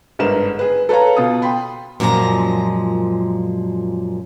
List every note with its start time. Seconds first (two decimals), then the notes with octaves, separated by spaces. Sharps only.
0.19 G1 G#2 D3 A#4 B4 E7
0.59 G#4 B4
0.89 A4 B4 C#5 F5 A#5
1.17 B2 F4 D#6
1.42 G5 B5 C6
2.00 F#2 A#2 F3 G#3 A#5